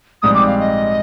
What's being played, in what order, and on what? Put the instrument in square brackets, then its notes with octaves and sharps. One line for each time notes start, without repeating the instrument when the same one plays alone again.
[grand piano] A#1 G#2 G3 C4 [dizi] D#6
[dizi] D6
F5
D#5